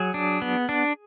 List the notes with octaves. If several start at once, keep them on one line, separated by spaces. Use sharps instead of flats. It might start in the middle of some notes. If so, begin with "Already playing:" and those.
Already playing: F#3 G#4
D4
B3
D4